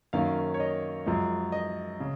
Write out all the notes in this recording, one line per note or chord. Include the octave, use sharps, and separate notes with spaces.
F#2 D#3 A#3 C#4 F5
C#5
D#5
F#2 F3 G#3
D#5
C#3